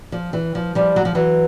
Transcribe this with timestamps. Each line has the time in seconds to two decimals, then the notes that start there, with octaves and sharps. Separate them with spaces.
0.12 F3
0.33 E3
0.55 F3
0.75 F3 G3
0.96 F#3
1.05 F3
1.15 E3 F#3